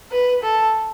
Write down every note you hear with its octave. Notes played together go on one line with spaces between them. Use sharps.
B4
A4